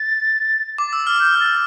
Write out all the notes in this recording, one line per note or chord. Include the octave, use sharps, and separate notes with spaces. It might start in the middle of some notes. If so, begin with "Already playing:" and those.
Already playing: A6
D6
E6
F6
G6
A6